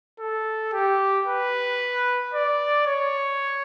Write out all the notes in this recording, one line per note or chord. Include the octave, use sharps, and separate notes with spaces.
A4
G4
B4
D5
C#5